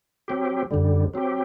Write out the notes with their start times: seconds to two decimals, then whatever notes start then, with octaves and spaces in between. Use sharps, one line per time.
0.28 F#3 C4 G4
0.71 F#2 D3 G3
1.14 F#3 C4 G4